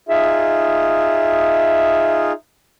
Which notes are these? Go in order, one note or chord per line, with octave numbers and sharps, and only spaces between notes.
D#4 F4 G#4 E5